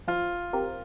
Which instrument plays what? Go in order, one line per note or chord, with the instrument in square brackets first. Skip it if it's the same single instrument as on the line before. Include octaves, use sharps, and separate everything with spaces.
[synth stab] F3 [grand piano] F4
[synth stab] C4 G4 A#4